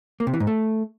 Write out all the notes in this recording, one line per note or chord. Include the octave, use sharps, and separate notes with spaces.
A#3
C3
E3
G#2
A3